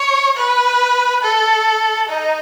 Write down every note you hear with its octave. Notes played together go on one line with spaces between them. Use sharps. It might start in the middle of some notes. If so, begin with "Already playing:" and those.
Already playing: C#5
B4
A4
D#4